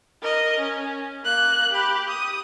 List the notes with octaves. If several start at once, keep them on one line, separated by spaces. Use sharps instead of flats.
A#4 D#5
C#4
A#3 F#6
G4 B5
D#6